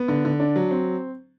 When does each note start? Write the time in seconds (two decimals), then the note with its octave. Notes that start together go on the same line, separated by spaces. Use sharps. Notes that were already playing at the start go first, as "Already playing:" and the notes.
Already playing: B3
0.08 D3
0.25 D3
0.40 D4
0.56 F#3
0.71 C4